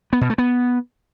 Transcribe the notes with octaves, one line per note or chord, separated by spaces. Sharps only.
B3
B2
A3
B3